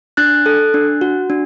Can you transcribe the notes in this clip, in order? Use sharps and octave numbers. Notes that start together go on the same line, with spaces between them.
D4 F#6 A6
A4
D4
F#4
D4